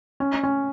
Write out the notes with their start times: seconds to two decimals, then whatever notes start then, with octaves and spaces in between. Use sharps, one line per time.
0.20 C#4
0.43 C#4